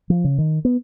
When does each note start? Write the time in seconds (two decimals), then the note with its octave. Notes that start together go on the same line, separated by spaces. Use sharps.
0.10 F3
0.24 C#3
0.38 D#3
0.65 B3